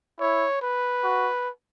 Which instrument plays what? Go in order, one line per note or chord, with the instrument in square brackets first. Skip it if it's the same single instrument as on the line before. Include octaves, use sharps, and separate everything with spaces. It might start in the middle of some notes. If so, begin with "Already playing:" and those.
[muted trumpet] E4 [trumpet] C#5
[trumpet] B4
[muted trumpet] F#4